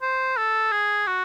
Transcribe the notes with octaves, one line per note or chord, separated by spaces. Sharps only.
C5
A4
G#4
F#4